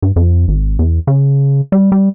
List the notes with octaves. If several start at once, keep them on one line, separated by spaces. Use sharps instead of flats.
G2
F2
G#1
E2
C#3
G3
G3